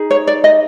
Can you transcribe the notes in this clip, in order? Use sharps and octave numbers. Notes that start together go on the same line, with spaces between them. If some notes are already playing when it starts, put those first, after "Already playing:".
Already playing: D#4 G#4
C#5
D5
D#5